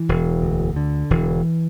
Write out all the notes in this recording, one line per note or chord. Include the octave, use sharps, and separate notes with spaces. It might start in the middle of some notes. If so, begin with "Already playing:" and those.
Already playing: E3
E1
D2
D3
E1 E3